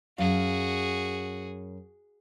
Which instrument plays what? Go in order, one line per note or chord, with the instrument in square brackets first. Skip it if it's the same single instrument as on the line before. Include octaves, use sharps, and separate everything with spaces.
[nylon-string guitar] F#2 F5 [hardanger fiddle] F#4 G#4